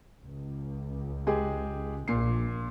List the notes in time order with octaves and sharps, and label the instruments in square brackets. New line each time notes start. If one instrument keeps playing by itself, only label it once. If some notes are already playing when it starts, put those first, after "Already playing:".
[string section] C#2
[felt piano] G#3 G4 G#4
[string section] A#1 [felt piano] A#2 C7